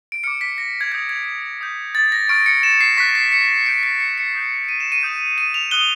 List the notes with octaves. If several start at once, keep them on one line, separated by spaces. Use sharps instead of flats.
D7
D6 F6 C#7
B6
A#6
G#6
D#6 G6 G#6
G#6
D#6 G6
A6
A#6
C#6 F6 D7
C#7
E7
C7
C#6 F#6 B6
C7
C#7
D#6 G6 D7
C7
C#7
C#7
D#6 G6
D#7
E7
D#7
D#6 G6
D#7
F7
D#6 F#6 G7